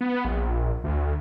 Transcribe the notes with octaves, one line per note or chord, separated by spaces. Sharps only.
B3
A#1
D2